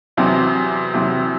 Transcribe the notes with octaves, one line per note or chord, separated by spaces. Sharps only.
E2 C3 F#3 C4 E4
E2 C3 F#3 C4 E4